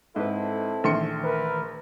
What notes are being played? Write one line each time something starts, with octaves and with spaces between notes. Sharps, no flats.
G#2 C4 E4 A4 B4 D#5
A#1 D#3 E3 A3 C6 C#7
A#4 B4